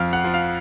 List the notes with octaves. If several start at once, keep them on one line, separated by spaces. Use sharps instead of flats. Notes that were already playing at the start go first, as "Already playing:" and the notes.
Already playing: F2 F5 F6
F#5 F#6
F3
F5 F6